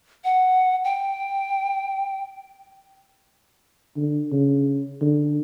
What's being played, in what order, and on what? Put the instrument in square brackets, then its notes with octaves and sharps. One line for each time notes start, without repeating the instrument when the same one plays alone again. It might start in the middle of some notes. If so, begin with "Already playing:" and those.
[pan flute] F#5
G5
[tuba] D3
C#3
D3